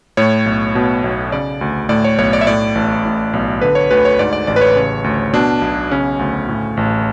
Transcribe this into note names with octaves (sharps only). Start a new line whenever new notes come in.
A2 C#5
B1
B2
B1
C#3 D5
D2
A2 D5
C#5
B1 C#5
D5
E5
A2 D5
A1
A2
B1
D3 B4
C#5
D2 B4
C#5
G#2 D5
D5
A1 D5
B4
C#5
C#3
D2
B2 D4
B1
C#3 C#4
D2
A2
A1